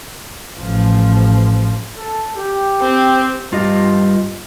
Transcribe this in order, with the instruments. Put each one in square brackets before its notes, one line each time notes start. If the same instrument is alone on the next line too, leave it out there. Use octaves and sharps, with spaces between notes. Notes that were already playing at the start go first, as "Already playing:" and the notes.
[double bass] A1 F3
[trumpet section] A4
G4
[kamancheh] C4
[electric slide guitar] G2 F4 G4 D#5